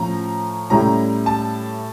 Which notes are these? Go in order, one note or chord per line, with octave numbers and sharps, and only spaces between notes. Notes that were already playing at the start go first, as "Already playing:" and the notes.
Already playing: A2 F3 C#4 A#5
A2 G3 C#4 E4 A#5
A5